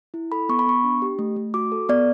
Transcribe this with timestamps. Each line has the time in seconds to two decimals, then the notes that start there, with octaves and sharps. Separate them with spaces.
0.14 E4
0.32 A4 B5
0.49 B3 C#6
0.59 B5
0.67 B3 C#6
0.84 D4
1.02 G4
1.19 A3
1.36 A3
1.54 F#4 D6
1.72 A4
1.89 B3 D5